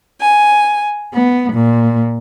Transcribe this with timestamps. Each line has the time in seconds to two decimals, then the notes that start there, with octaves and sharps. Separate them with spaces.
0.20 G#5
1.14 B3
1.53 A#2